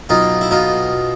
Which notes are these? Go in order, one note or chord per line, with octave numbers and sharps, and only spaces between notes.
B1 D#4 F4
E4
B2 D#4 F4